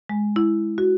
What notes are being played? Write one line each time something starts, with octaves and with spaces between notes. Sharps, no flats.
G#3
E4
F#4